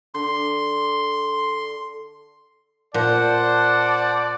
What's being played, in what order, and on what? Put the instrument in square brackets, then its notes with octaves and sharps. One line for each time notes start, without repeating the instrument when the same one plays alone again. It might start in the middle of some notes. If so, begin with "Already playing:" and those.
[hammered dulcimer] D3 [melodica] C6
[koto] A#2 [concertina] C5 F#5 [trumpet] D5 [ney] A5